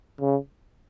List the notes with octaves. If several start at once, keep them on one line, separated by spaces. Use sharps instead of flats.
C#3